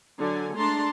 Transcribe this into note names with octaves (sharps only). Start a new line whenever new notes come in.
D3 F#3 A4 G#5
G#3 A3 D4 A5 A#5 C6